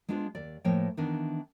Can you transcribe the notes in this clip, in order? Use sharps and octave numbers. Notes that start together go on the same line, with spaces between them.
G#3 B3 D4 F4 C5
D#2 D5
A2 F3 A#3 C#5 G5
D#3 E3 B3 D4 D#4